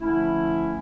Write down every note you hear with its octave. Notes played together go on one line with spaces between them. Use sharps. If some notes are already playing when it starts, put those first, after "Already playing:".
D3 F3 A3 C#4 E4